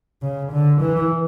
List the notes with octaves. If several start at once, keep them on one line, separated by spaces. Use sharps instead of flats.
C#3
D3
E3